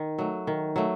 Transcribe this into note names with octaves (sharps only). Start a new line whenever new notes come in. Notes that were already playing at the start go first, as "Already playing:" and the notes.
Already playing: D#3
F#3 A3
D#3
F#3 A3